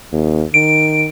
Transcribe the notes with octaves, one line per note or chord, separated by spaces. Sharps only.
D#2
D#3 D7